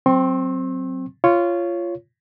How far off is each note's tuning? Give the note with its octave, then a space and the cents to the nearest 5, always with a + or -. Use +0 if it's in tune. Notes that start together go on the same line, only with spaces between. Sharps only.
F#3 +0 C4 +0 C6 +45
F4 -15 C#5 +0